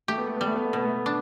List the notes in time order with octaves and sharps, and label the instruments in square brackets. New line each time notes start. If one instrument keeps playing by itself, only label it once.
[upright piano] A3 [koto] G4
[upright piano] B3
A3
[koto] G3 [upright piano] B3
[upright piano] A3
B3
A3
[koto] B2 [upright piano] B3
[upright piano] A3
[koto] D4